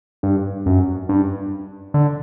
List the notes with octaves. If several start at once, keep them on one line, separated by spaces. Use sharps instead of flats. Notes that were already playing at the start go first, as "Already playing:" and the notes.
G2
F#2
G2
D3